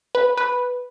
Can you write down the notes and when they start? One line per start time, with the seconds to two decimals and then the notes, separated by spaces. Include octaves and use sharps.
0.15 B4
0.37 B4